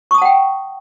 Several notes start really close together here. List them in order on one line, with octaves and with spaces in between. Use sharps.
C#6 D#6 A5 F#5 G5